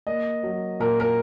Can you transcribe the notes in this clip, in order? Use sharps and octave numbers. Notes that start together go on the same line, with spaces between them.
A#3 D#5
F#3
A#2 A#4
A#4